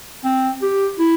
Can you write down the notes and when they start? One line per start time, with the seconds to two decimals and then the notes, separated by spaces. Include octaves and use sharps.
0.25 C4
0.62 G4
0.99 E4